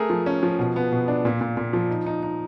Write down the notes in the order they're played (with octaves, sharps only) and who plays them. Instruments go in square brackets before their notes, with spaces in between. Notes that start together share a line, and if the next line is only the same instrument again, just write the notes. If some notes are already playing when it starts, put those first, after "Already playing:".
Already playing: [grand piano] A3 G#4 A#4
F3
C#4
F3
B2
B3
B2
D4
A#2
A#2
A#2
F3
D#4
D#4
D#4